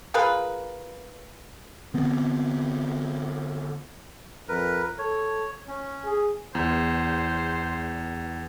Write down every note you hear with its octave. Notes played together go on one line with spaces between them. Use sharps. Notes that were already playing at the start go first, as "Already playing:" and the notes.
F4 G#4 A#4 B4
D3 B3 C4
F2 A#4 B4
A4 C#5
C#4 C#5
G#4
E2 C5